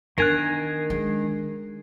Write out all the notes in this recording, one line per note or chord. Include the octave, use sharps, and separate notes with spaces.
D#3 B3 D4 A#4 G#5 F#6 C7
G#3